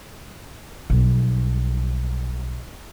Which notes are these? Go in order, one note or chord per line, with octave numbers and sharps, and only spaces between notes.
B1 G3